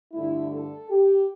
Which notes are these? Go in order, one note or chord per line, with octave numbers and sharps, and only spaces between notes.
G2 D3 A3 E4
A4
G4